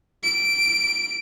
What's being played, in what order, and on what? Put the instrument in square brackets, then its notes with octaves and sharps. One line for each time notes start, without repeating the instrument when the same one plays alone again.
[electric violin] D7